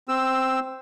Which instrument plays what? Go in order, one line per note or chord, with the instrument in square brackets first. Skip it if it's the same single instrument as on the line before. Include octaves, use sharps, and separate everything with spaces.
[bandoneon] C4 E6